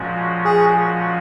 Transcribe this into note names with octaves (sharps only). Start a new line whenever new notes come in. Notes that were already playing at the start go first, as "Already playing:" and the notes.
Already playing: A#2 F3 G#3 C#4 F#4
G#4